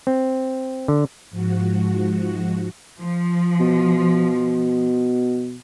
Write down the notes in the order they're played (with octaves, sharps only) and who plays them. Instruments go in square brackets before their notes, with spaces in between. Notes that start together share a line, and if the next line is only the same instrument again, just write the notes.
[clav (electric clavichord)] C4
D3
[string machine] G#2 F3 F#4
[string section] F3
[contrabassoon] B2